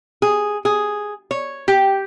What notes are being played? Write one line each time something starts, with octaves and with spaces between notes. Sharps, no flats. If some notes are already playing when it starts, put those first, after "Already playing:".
G#4
G#4
C#5
G4